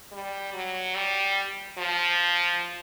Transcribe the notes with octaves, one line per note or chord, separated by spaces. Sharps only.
G3
F#3
G3
F3